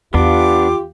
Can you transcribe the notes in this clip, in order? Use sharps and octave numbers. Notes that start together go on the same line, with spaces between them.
E2 B3 D4 F4 G4 D6